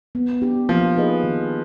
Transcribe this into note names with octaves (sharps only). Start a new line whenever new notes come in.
B3
D4 G4
F3 A#3
D#4 G#4 B4 D#5
D#3